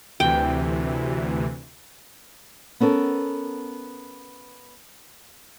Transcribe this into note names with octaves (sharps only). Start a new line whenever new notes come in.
D2 C3 E3 G5
B3 C#4 A4 A#4